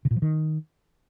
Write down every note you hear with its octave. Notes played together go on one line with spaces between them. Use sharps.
C#3
A#2
F3
D#3